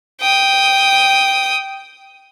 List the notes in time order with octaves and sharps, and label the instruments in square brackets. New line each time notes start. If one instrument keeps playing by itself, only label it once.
[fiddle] G5 D#6